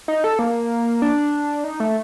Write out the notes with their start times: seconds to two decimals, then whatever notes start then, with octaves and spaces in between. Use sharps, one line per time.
0.08 D#4
0.24 A4
0.39 A#3
1.02 D4
1.64 D#4
1.80 A3